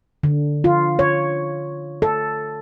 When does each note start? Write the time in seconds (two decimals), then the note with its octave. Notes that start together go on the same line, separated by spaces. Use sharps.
0.23 D3
0.64 F4
0.99 C#5
2.02 A4